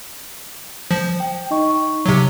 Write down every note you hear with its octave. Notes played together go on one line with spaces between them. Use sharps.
F3
G5
D#4 D#5 C#6
C3 F#3